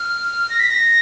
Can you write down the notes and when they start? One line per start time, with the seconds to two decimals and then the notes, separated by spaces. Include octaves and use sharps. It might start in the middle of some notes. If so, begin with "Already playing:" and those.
Already playing: F6
0.50 A#6
0.60 B6
0.70 A#6